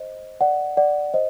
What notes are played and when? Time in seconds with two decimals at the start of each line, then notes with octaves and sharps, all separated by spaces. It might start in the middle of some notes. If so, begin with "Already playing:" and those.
Already playing: C5 D#5
0.41 D5 F#5
0.77 D5 F#5
1.14 C5 D#5